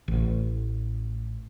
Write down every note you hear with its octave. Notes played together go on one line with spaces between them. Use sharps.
A1